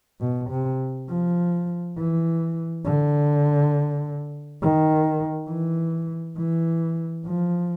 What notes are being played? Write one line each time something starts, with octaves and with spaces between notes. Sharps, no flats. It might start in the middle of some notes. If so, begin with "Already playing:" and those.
B2
C3
F3
E3
D3
D#3
E3
E3
F3